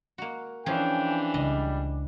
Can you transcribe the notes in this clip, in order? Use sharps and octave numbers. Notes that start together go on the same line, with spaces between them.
A#3 F#4
E3 F3 C#4 D4 G#4 G5
C#2 G3 D#5